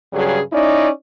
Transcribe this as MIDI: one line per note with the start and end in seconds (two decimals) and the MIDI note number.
0.13 0.40 43
0.13 0.40 49
0.13 0.40 54
0.13 0.40 55
0.13 0.40 68
0.52 0.89 61
0.52 0.89 63
0.52 0.89 64
0.52 0.89 74